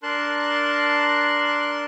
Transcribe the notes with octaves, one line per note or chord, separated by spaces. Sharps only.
D4 A#4 A5 C6 F#6